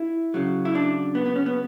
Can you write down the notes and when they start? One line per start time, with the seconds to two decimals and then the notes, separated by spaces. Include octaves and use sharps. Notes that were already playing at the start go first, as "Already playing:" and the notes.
Already playing: E4
0.34 C#3 F#3
0.65 E4
0.75 D4
1.15 B3
1.26 B3
1.36 C#4
1.46 B3